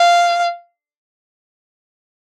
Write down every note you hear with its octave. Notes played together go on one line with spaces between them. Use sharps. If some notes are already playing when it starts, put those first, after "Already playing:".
Already playing: F5